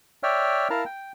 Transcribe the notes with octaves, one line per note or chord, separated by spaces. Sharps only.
C#5 D5 E5 G5 F6
E4 A#4 F5 A5 A#5 F6
G5